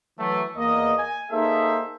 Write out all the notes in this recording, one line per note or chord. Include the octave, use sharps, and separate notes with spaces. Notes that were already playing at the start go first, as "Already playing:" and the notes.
E3 F#3 A3
E2 A#3 D#5
G#5
A#3 D#4 G#4 A4 C5 E5